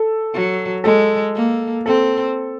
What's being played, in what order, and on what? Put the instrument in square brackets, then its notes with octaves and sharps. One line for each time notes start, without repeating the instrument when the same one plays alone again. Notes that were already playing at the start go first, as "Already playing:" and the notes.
Already playing: [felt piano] A4
[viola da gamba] F#3
[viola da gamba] G#3 [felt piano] A4
[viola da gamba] A#3
[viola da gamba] C4 [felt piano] A4